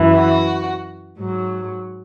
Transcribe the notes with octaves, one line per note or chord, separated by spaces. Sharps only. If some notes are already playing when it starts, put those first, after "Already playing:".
Already playing: F#2 E3
F#4
G#2 F#3